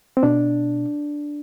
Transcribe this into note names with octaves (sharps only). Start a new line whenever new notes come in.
C4
B2 D4